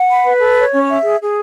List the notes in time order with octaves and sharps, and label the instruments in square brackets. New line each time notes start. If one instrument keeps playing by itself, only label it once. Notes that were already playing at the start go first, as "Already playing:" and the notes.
Already playing: [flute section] F#5
B5
B4
A4
C#5
C#4
E5
G#4
G#4